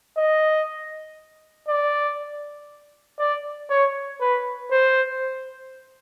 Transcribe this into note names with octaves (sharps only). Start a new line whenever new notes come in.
D#5
D5
D5
C#5
B4
C5